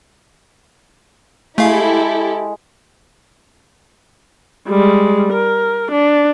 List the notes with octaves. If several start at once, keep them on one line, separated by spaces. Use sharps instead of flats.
G#3 A3 E4 G4 A4 F5
G3 G#3
A#4
D4